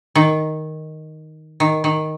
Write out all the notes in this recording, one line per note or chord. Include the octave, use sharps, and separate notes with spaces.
D#3
D#3
D#3